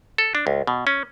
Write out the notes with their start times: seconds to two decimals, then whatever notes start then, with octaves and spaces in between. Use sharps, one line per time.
0.18 A4
0.35 D4
0.47 C#2
0.67 B2
0.87 C#4